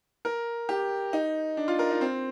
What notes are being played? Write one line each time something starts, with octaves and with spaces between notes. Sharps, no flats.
A#4
G4
D#4
D4
F4
A#4
D#4
C4